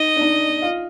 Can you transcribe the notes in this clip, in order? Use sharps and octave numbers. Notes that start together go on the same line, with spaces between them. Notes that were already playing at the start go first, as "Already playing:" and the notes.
Already playing: D#4 D#5
D4
D#4
F4